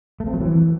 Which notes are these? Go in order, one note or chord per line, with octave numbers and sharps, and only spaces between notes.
A3
C4
F#3
E3